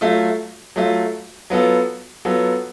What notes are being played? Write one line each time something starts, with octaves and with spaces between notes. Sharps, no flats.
F#3 A3 F4
F#3 A3 F4
F#3 B3 F4 A4
F#3 B3 F4 A4